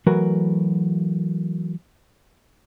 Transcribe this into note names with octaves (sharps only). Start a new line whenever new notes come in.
E3 F#3 A3 F#4 A#4 B4